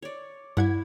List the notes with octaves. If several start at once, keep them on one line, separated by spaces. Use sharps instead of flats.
C#5 D5
G2 E4 F#5 G#6